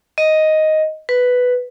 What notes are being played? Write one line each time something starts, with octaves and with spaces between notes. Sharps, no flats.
D#5
B4